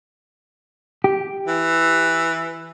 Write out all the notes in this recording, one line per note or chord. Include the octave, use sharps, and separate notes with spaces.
G4
E3